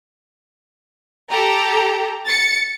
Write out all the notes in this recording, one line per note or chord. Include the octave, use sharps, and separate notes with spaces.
G4 A4 A#5
A6 C#7